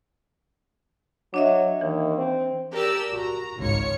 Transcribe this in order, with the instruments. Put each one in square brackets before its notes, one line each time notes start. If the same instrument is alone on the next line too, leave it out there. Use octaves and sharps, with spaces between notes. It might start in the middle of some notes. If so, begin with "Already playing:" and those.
[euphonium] F#3 [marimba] D4 D#5 E5
[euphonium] D#2 [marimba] E3
[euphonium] C4
[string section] G4 A#4 D5 A5 E6
F#4 A#5
G#1 C#2 F4 C#5 C#7